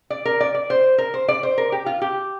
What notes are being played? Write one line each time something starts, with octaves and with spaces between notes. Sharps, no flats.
D5
A#4
D5
D5
C5
A#4
C5
D5
C5
A#4
G4
F4
G4